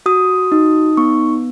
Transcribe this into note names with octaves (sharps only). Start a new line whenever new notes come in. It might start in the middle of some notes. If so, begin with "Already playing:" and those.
F#4 D#6
D#4
B3 C#6